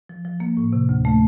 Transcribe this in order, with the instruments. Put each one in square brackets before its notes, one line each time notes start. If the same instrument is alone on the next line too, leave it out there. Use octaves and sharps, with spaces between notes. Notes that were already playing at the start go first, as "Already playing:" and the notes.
[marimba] F3
F3
A#3
A2
C3
D2
A3